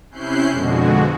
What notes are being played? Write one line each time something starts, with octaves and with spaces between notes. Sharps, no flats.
C3 C#4 E4 F#6 G6 C7
F2 B2 D3 G#3 F#4